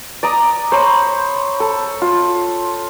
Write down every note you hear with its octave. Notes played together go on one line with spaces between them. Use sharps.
D5 A#5 D#6
C5 C#5 A#5 B5
A4
F4